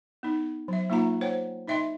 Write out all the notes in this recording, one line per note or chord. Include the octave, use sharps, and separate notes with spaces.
B3 D#4
F#3 E5
A#3 D#4 F4 F#5 A#5
C5 C#5 F#5 G5
D#4 D#5 E5 G5 C6